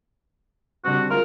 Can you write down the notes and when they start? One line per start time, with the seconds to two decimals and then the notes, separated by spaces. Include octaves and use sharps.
0.85 D3 G3 C4 F#4
1.10 G#3 F4 A#4